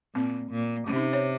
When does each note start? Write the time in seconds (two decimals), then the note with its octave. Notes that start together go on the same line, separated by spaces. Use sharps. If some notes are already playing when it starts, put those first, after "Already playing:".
0.15 A#2 C4
0.51 A#2
0.87 C3 C#4
0.96 D#4
1.13 C#5